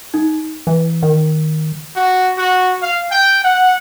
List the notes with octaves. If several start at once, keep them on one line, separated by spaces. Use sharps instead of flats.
D#4
E3
D#3
F#4
F#4
F5
G5
F#5